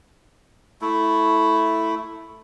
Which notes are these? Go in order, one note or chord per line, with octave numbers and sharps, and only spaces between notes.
A3 E4